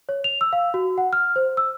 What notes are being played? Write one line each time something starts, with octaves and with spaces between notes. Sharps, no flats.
C#5
F7
E6
F5
F#4
F#5
F6
C5
E6